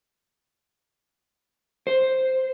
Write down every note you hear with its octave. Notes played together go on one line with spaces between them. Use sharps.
C5